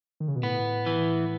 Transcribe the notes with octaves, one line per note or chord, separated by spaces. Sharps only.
D#3
C#3
B2
A2 B3
E3